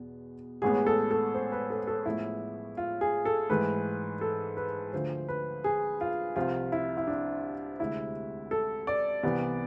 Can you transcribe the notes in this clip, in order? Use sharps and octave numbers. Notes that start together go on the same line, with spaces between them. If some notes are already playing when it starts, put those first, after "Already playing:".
Already playing: E2 B2 B3
A1 A2 G#3 B3 G#4
A4
A4
C5
B4
A4
A4
A1 A2 F3 G#3 B3 E4
F4
G#4
A4
G#2 E3 A3 B4
A4
B4
D2 D3 F3 A3 C5
B4
G#4
F4
C2 C3 F3 F4
E4
E4
D4
D2 C3 G#3 C4 E4
A4
D5
C2 C3 E3 B3